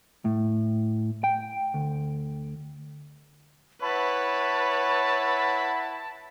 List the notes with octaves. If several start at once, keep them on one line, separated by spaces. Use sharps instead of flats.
A2
G5
D2
E4 B4 C#5 F#5 A5 B5